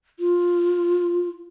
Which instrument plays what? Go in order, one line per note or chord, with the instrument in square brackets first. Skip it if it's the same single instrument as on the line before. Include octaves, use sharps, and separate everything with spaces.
[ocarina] F4